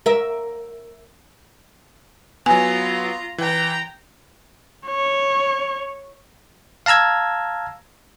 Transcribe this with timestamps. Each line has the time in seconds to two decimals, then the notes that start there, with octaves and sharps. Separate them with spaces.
0.06 A#4 E5
2.46 F#3 B3 F4 G#5 A#5
3.38 E3 G5 A#5
4.87 C#5
6.86 F5 A5 A#5 E6 G#6